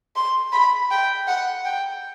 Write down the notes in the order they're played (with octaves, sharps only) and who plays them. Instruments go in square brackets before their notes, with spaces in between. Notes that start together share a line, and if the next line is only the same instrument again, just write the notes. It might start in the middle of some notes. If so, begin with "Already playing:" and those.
[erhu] C6
B5
G5
F#5
G5